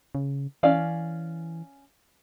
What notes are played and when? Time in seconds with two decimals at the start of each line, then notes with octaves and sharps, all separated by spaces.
0.15 C#3
0.63 E3 C#4 D5 F5